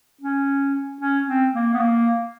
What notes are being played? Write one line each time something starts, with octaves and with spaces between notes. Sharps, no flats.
C#4
C#4
C4
A#3
B3
A#3